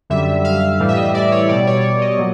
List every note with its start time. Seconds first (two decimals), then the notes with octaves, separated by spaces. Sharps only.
0.10 F#2 D3 G3 E5
0.44 F5
0.80 A2 E3 G3
0.88 E5
0.97 D#5
1.14 D5
1.32 C#5
1.49 B2 G3 D5
1.67 C#5
1.84 C#5
2.01 D#5
2.19 A#2 F#3